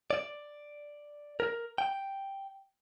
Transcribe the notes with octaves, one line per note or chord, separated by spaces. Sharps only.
D5
A#4
G5